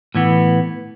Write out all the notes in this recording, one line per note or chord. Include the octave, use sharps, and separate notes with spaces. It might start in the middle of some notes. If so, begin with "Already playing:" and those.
A2 E3 B3